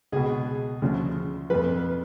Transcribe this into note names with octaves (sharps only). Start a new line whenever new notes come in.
C#2 B2 G#4
D2 C#3 F3
F2 F3 B4